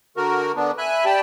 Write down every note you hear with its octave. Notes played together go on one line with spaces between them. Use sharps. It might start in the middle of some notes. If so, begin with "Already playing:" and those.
D3 F#4 A#4
D3 B3 D4
E5 G#5 B5 F#6
G4 D5 G5 A5 B5